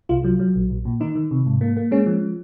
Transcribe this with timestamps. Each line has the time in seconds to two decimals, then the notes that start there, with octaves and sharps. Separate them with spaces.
0.09 C2 F4
0.24 F#3
0.39 F#3
0.55 A#1
0.70 A#1
0.85 A#2
1.00 D#3 D#4
1.15 D#3
1.31 C3
1.46 G#2
1.61 A#3
1.77 A#3
1.91 G#3 C#4
2.06 F3